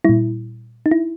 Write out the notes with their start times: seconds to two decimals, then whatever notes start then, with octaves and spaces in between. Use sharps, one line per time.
0.04 A#2 G3 E4
0.86 D#4
0.91 E4